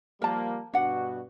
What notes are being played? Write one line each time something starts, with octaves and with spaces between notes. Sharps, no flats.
F3 G3 A#3 A#4 A5
G2 B2 D4 F#4 F#5